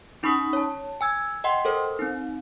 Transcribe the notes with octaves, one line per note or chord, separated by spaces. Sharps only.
C#4 D#4 B5 C#6 D#6 B6
C#5 A5
G#5 E6 G#6
D#5 F#5 G5 C6
A4 A#4 C5
C4 D#4